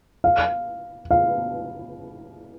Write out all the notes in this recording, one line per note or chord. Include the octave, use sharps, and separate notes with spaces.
F5
F5